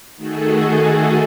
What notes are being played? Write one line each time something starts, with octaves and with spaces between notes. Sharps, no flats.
D#3 A3 F#4 G#4 A4